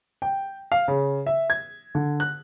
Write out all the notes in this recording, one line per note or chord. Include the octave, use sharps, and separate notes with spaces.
G5
F5
C#3
E5
G#6
D3
F#6